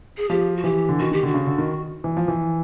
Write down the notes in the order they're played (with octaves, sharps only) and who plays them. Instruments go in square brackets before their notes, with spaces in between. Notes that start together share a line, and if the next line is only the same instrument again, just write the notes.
[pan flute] G#4
[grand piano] F3 [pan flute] G4
[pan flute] F#4
[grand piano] E3 [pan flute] G4
[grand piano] D3
[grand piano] D#3 [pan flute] F#4
[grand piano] D#3 [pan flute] G4
[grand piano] D3 [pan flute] F#4
[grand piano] C#3
D3
D#3
E3
F3
E3